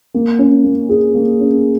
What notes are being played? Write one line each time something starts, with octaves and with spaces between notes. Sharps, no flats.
A#3
C#4
A#3
G#4
A#3
C#4